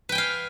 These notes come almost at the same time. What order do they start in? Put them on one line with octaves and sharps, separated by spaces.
B4 G5 G#5 F5